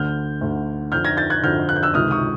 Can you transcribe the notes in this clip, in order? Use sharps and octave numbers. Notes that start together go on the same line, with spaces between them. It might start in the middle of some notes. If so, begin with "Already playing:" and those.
Already playing: D2 D3 F6 G6
D2 D3
F2 D3 F6 G6
G#6 A#6
G6 A6
F#6 G#6
F2 D3 F6 G6
F#6
G6
E6 F#6
C#2 C3 D#3 D#6 F6
C#6 D#6